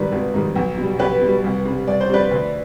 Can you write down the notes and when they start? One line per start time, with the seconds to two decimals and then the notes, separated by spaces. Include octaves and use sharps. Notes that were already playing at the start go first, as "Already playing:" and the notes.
Already playing: G#1 G#2 D#3 G3 B4 D5
0.12 G#1
0.34 G#2 D#3 G3
0.55 B1
0.78 B2 G3
0.99 B1 G4 B4
1.22 B2 G3
1.44 C2
1.65 C3 G3
1.87 C2 D5
2.01 C5
2.09 C3 G3 B4 D5
2.31 D2